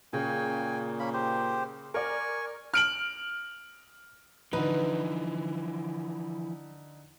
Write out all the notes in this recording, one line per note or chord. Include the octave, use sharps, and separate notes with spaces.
A#2 C#3 G5 G#5
A#3 C#4 B5
G4 C5
A#4 D5 G#5 C#6
F6 D7 F#7
D3 E3 F3 D#4 B4